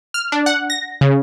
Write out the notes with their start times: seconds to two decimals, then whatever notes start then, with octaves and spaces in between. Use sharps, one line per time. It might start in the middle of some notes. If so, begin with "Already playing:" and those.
0.14 F6
0.32 D4
0.46 F#5
0.70 A#6
1.01 C#3